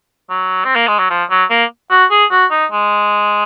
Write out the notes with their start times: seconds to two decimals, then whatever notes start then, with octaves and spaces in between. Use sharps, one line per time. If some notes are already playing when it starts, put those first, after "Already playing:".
0.30 F#3
0.65 C4
0.76 A#3
0.88 G#3
0.99 F#3
1.10 F3
1.30 F#3
1.50 A#3
1.91 F#4
2.11 G#4
2.31 F#4
2.51 D#4
2.72 G#3